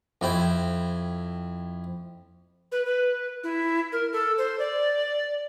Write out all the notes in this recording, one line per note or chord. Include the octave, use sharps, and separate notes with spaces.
F2 E4 G5
B4
B4
E4
A#4
A4
C5
D5